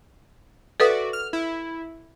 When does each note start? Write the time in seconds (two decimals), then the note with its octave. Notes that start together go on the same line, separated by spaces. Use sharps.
0.80 F#4 A4 B4 D5 E5 D#6
1.13 F6
1.33 E4